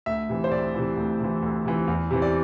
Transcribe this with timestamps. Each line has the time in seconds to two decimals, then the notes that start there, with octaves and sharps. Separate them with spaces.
0.06 D2 E5
0.29 C3 E3
0.44 C5
0.51 D2 D5
0.74 C3 E3
0.97 D2
1.20 C3 E3
1.42 D2
1.65 C3 E3
1.88 E2
2.11 C3 E3
2.22 D5